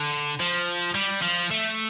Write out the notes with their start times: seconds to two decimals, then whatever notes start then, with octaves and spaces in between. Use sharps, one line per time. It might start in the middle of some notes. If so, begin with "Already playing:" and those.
Already playing: D3
0.40 F3
0.95 G3
1.22 F3
1.51 A3